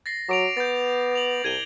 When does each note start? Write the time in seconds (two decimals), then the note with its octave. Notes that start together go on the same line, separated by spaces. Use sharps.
0.06 A6 A#6 C7
0.29 F#3 D6 D7 F7
0.57 B3 G6 A6
1.13 D6 F7 F#7
1.44 C2 G#6 D#7 G7